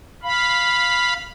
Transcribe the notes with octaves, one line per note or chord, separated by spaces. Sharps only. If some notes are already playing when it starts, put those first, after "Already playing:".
F5 B5